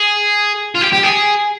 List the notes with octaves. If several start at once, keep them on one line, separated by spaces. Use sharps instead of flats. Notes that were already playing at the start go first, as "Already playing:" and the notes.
Already playing: G#4
F4
G4
G4
G#4